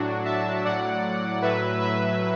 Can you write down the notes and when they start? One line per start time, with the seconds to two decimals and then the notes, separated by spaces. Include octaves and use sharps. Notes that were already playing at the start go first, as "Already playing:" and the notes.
Already playing: A2 F#3 D4 F#4
0.25 E5 A5
0.65 A2 F#3 D5 F#5
1.42 A2 F#3 B4 E5
1.81 B4 E5